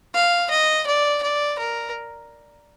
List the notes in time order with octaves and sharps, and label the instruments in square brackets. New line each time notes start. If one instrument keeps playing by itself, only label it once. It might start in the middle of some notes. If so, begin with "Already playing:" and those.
[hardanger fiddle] F5
D#5
D5
D5
A#4